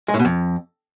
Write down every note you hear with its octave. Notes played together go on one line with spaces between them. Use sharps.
G#3
A2
B2
F2